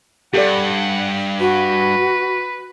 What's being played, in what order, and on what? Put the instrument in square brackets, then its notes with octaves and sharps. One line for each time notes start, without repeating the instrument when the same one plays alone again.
[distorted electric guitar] G2 [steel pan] G4 A4 D5 [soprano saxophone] F#5
[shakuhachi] F#4 [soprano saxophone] B4